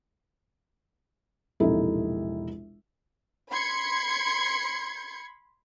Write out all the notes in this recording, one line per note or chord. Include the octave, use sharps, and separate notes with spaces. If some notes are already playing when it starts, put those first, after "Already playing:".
E1 A#1 C3 D#4 E4 A4
B5 C6 G#6 C#7